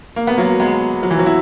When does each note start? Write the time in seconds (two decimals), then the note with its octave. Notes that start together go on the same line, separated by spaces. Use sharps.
0.16 A#3
0.27 B3
0.38 F#3 A#3
0.60 G#3 B3
1.03 F#3
1.11 E3
1.19 F#3
1.26 E4